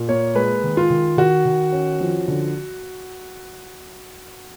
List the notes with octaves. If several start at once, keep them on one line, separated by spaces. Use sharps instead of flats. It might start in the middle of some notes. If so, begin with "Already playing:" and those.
Already playing: A#2
A#3 C#5
G#3 B4
D#3
F4
D#3
D#3 F#4
D#3
C#4
F3
D3